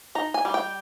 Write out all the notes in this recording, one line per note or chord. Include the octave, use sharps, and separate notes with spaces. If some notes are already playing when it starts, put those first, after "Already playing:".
D#4 A#5
G#5
G3
G5